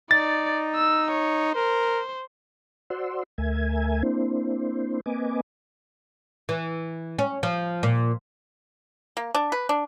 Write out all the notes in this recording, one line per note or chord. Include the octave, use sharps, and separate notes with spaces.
D#4 D5 A6
E6
C#5
A#4 C5
F#4 C5 D5 F#5 C6 E6
D2 A3 A#4 E5 G#5 G#6
A#3 C4 D4 E4 C5
A#3 C4 B4 D#5 G#5 D6
E3
C#4
F3
A#2
A#3
D4
B4
D4